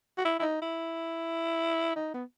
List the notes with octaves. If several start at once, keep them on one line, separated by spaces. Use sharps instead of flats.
F#4
E4
E4
D#4
E4
D#4
B3